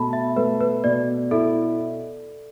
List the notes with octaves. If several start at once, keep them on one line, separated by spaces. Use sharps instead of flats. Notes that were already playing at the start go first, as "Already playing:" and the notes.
Already playing: B2 A3 A5 B5
E5
A3 B4
B4
B2 D5
E4 A4